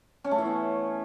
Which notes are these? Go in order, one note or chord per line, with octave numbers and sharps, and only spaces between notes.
C#4
A3
E3
B3